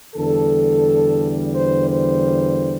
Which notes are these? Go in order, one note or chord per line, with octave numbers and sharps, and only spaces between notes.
E2 D3 G3 A4
C5
C5